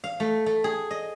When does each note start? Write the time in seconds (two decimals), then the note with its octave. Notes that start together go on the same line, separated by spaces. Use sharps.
0.04 F5
0.20 A3
0.46 A3
0.64 G#4
0.91 D#5